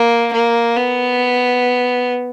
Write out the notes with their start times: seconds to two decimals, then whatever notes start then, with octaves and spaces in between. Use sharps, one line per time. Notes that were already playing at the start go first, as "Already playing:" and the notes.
Already playing: A#3
0.33 A#3
0.76 B3